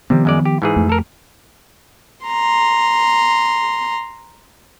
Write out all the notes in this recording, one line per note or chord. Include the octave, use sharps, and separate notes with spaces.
C3 D#3 F3 G3 B3
F#2 G#3 D5
G4
G#2 E3 G#4
F2 A3
A4 A#4
A#5 C6